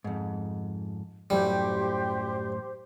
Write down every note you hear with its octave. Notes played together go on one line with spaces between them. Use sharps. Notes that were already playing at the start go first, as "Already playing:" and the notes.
F2 G#2
F#2 A2 F#3 G3 G4 C5